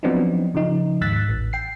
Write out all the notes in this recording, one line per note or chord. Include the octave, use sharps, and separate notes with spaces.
F3 F#3 B3 C4 D4 D#4
C#3 F3 D#4
D#2 G#2 E6 F#6 A6 B6
A1
G5 C7